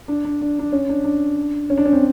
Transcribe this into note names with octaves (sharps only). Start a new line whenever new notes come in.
D4
D4
D4
D4
C#4
D4
D4
C#4
D4
C#4
C4